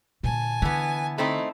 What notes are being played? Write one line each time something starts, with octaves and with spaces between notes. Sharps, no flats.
A#2 D3 G#5 A5
D3 E3 B3
A3 C4 D#4 E4